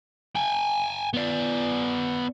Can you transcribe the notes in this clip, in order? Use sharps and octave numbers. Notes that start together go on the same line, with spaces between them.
G5 G#5
B3 D5